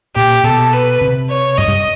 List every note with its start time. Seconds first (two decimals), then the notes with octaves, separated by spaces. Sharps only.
0.15 A#2 G4
0.44 B2 A4
0.73 B4
1.01 C3
1.29 C#5
1.58 G2 D#5
1.68 G2